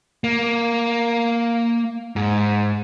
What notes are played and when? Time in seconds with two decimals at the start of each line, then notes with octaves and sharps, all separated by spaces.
0.24 A#3
2.16 G#2